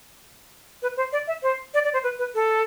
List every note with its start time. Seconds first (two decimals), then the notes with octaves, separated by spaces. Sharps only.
0.82 B4
0.97 C5
1.12 D5
1.27 E5
1.43 C5
1.74 D5
1.84 D5
1.93 C5
2.03 B4
2.19 B4
2.35 A4